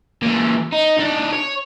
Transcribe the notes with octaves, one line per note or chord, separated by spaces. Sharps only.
A#2 E3
D#4
D4 D#4
C#5